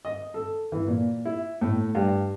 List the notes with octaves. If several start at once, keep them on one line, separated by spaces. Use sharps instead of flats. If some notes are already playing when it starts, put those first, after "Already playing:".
D#5
A4
E3
A#2
E4
A2
G2